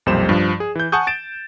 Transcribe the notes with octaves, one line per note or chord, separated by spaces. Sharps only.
B1 F2 A#2 G3 C5 E7
G2 F3
G#4
E3 G6
F#5 G#5 A5 C#6 D#6 G6
A6 D7 E7